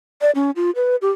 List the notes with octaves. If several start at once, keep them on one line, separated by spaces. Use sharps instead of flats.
D5
C#4
F4
B4
G4